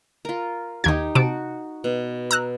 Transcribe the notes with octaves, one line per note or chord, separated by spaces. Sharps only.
F4 A#4
D#2 D#4 G4 G#6
C3 F#4 A5 D7
B2
A#5 E6 F#6